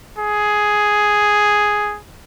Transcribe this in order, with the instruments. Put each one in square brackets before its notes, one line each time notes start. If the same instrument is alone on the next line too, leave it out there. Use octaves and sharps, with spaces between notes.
[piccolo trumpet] G#4